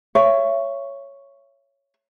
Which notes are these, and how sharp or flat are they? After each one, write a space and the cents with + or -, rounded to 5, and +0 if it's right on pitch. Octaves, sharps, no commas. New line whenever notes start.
C#5 +0 E5 +30